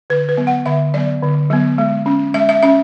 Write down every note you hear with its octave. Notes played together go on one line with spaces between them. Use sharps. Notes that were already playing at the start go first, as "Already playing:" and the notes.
D3 B4
B4
F#3 B3
F#5
D3 E5
F#3 B3 D5
D3
F#3 B3
G#3
C#4
G#3 E5
E5
C#4 E5